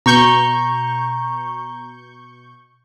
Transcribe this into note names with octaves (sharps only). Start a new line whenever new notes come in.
B2 A#5 C#6 G6